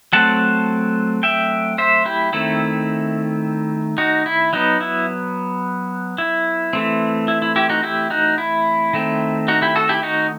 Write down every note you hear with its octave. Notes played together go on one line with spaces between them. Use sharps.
F#3 A3 C4 F#5 A5
E5 G5
C5 E5
E4 G4
D#3 A3 C4 E4
D#4 F#4
E4
F#3 B3 D#4
E4
E4
E3 A3 C4
E4
E4
E4 G4
D#4 F#4
E4 G4
D#4 F#4
E4
D#3 A3 C4
D#4 F#4
E4 G4
F#4 A4
E4 G4
D#4 F#4